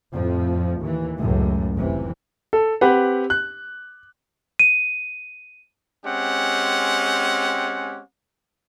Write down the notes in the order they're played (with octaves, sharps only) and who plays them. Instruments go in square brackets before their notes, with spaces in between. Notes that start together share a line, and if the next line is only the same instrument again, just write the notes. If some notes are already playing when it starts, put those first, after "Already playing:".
[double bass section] F2 A2 F3
D#2 E3
C#2 F#2 A2
F1 C3 E3
[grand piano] A4
C4 G4 B4 F#5
F#6
[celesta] D#7
[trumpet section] G#3 C4 C#4 G4 F#5